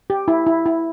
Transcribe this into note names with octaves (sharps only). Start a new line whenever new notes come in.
G4
E4
E4
E4